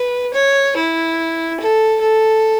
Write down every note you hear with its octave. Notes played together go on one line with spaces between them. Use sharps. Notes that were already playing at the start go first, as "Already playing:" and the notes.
Already playing: B4
C#5
E4
A4
A4